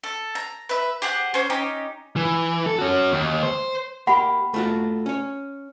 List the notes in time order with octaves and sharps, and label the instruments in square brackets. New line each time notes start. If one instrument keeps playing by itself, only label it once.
[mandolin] A4
A#5
B4 E5
G4 G#4 C5 F#5
C#4 C5
C#4 D#4 G4
[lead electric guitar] E3
A4
C#4 F#4
D#2
C5
[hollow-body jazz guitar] A#3 G4 [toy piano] F#5 B5
[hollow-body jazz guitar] A3 F4 F#4
C#4 C#5